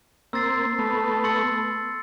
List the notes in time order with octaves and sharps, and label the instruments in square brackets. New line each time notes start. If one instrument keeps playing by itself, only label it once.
[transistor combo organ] A#3 C4 [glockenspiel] E6 A6 C7
[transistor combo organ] A3 B3
[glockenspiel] C6 E6 A6 C#7